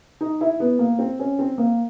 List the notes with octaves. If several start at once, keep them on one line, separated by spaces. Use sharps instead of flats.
D#4
E4
B3
A#3
C4
C#4
C4
A#3